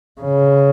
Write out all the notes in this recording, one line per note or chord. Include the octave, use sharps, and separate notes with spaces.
C#3